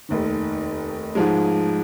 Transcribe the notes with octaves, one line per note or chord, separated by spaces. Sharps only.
F1 D#2 D#3
G#2 F3 G#3